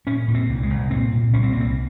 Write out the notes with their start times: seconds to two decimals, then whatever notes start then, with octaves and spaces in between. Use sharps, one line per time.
0.07 A#2 C#4
0.28 A#2
0.35 C4
0.49 C2
0.63 G#3
0.70 C2
0.91 A#2 C4
1.12 A#2
1.34 C2 C#4
1.43 C4
1.52 C2 A#3
1.60 C4